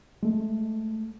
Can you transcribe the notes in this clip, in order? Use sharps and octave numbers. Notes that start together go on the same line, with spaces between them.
G#3 A3